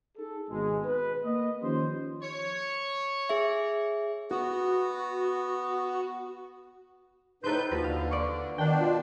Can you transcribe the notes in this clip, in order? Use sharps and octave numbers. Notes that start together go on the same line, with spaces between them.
D#4 G#4 A4
G#1 B2 G#3
B4
A#3 B3 D#5
D#3 F3 C#4 G4 C5
C#5
G#4 E5
B3 F#4
A2 D#4 A4 B4 C5 G6
D#2 F3 F4 F#4 B4
D3 F5
D5 C#6
B2 D#3 D4 F#5 G5
F4